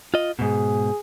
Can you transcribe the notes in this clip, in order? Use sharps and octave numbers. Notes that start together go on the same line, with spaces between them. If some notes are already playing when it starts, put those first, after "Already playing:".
F4 D#5
G#2 B2 G#4